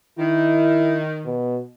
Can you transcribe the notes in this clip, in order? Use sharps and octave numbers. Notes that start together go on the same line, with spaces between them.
D#3 E4
B2